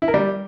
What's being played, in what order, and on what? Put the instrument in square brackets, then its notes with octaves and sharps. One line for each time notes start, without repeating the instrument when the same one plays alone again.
[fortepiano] E4
A#4
G3